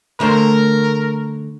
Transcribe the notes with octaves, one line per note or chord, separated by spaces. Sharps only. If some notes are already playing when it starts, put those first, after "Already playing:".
D3 A3 A#4 C5